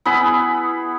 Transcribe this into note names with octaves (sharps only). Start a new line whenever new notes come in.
B3 E4 G#4 B5